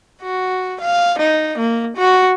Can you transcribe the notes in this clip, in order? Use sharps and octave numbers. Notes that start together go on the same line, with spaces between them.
F#4
F5
D#4
A#3
F#4